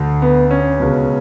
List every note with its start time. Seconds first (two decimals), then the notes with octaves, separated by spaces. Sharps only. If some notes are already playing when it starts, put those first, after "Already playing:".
Already playing: D2 D3
0.22 B3
0.51 C#4
0.80 C#2 B2